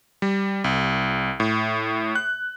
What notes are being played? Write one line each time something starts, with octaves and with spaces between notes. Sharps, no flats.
G3
C2
A2
F#6